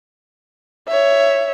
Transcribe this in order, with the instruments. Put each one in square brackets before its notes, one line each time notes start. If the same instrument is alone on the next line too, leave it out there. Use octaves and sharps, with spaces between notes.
[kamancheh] C#5 E5